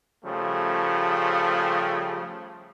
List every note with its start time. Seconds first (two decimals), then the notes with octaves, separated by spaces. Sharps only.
0.25 C#3 F3 G3 A3